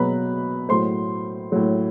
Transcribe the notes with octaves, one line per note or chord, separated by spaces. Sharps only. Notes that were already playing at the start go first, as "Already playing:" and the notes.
Already playing: B2 F#3 B4 A#5 B5
A2 F#3 C5 C6
A2 F#3